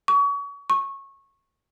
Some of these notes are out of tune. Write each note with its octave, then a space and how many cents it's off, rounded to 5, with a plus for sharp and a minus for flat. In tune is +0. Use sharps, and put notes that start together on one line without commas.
C#6 +35
C#6 -15